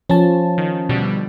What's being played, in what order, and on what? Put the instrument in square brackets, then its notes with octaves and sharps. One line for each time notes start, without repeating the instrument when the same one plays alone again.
[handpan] F3 [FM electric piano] C#4 A5
[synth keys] D#3
B2 D3 G3